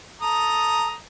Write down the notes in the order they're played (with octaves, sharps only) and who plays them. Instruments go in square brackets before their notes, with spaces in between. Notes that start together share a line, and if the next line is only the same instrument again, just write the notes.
[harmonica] A4 A#5 D#6